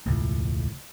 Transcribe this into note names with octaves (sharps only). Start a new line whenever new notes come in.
E1 C#2 A2